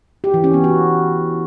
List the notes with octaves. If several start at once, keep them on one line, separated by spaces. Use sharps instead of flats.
G4
E3
C#4
B3
F#4